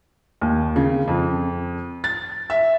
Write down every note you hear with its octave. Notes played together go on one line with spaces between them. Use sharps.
D#2
C#3
F2
A6
E5